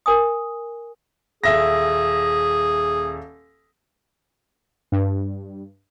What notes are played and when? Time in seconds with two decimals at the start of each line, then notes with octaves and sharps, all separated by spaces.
0.06 A#4 G#5 D#6
1.44 D#1 G#4 E5 A#6
4.92 G2